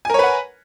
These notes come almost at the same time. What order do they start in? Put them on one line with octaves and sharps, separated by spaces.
G#5 A#4 C#5 B4 F#5